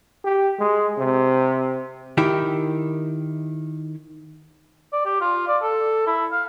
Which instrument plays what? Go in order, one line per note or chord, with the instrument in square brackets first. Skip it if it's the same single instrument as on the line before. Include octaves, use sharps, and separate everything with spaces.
[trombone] G4
G#3
C3
[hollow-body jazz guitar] D#3 E4 G4
[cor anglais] D5
G4
F4
D5
A4
E4
F5